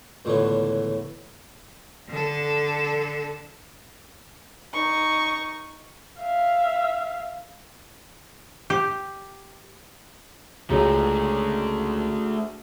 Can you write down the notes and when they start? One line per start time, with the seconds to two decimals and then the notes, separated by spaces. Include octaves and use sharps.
0.25 C#2 A2 D3 E3 B3
2.09 D3 A4
4.73 D#4 C#6
6.20 E5 F5
8.70 G4
10.70 C#2 A3 D4 F#4 G#4 A#5